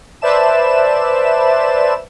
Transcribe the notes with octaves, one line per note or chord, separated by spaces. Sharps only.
B4 C5 D5 E5 A5 E7